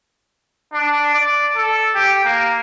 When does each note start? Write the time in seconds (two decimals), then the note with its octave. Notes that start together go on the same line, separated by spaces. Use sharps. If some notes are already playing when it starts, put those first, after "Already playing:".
0.73 D4
1.14 D5
1.55 A4
1.95 G4
2.25 A#3